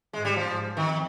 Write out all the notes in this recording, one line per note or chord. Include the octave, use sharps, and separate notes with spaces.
G#2 G#3
G3
F3
G#2
F2 D#3